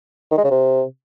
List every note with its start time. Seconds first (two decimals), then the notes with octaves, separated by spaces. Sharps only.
0.31 D#3
0.38 G#3
0.44 C#3
0.51 C3